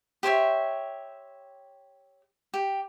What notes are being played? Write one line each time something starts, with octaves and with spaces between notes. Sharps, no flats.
G4 C5 C#5 E5
G4